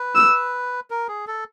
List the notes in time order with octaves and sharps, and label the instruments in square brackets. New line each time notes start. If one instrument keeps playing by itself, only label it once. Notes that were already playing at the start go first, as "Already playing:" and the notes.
Already playing: [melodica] B4
[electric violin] E6
[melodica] A#4
G#4
A4